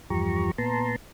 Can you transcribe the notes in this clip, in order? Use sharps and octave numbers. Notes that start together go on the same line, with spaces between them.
E2 G2 F3 G4 A#5 C#6
A#2 B3 A5 A#5 C6